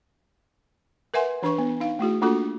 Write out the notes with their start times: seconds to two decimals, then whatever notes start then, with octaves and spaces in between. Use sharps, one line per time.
1.14 A#4 B4 E5 F#5 G#5 C6
1.43 E3 D4 B4 C#6
1.58 B3
1.80 D#4 F5
1.99 A3 E4 F#4 G#4
2.22 A#3 D4 F4 F#4 A4